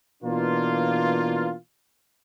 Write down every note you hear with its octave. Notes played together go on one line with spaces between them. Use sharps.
B2 E3 A#3 D4 F4